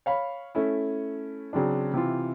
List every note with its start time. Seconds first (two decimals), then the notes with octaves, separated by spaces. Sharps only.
0.06 C#5 F5 B5
0.55 A3 C#4 E4
1.53 C#3 F#3 C4 D4
1.93 C3 E3 F4